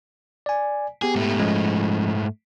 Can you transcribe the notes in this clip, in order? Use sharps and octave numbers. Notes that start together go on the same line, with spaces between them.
D5 G#5
B3 G4 G#4
G#2 A3
F3 G#3 C#4